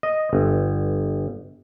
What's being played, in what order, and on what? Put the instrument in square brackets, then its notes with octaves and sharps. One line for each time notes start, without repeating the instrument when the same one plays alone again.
[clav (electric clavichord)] D#5
G1